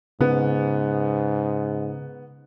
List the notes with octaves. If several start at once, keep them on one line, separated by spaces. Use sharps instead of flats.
G#2 C#3 B3